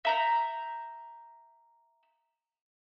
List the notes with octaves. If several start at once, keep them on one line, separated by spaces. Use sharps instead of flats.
E5 A#5 G6